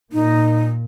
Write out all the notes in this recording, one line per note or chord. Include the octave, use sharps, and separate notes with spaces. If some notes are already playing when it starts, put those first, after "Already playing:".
A#2 D#4